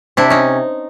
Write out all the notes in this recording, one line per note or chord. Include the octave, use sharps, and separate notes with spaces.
C3 D4 E4
C#4 D#4